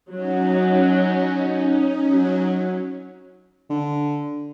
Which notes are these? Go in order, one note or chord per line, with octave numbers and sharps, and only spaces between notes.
F#3 C#4 D#4
F#3
D3